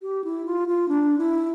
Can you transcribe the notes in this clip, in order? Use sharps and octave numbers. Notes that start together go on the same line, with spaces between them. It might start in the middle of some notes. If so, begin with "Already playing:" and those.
G4
E4
F4
F4
D4
E4